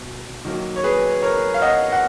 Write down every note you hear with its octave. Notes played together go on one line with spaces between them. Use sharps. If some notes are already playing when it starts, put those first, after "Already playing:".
Already playing: B2
D#3 F#3 A#3
C#5
G#4 B4
A#4 C#5
F5
D#5 F#5
F#5